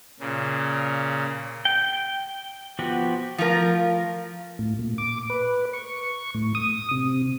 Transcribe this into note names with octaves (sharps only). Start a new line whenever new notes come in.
A#2 C#3
G5
F3 B3 F#4 G4
F3 A3 F4 A#4
A2
A#2
D6
B4
C#6
A2
D#6
C3